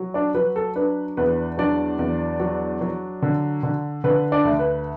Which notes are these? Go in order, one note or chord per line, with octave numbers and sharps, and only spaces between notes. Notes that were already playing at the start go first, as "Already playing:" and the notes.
Already playing: F#3
D4 D5
F#3 B4
A4
D4 B4
E2 B4
F#3 D4 D5
E2
F#3
F#3
D3
D3
D3 B4
D4 D5
D2
B4